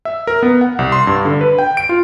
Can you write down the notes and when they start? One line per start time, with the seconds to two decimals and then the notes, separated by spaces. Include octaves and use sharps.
0.05 E5
0.27 A#4
0.43 B3
0.61 F#5
0.79 C2
0.92 C6
1.07 G2
1.25 D3
1.41 B4
1.59 G5
1.77 D7
1.89 F4